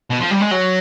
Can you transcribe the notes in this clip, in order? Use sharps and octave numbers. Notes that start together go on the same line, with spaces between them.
B2
F3
G3
G#3
F#3